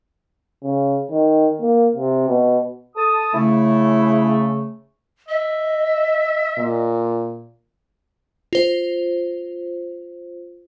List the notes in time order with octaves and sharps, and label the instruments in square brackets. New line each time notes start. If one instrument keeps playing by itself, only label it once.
[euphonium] C#3
D#3
A#3
C3
B2
[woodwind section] A4 A5 D#6
[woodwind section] C#3 A3 [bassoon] E4
[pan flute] D#5 [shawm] E5
[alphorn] A#2
[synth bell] F4 C5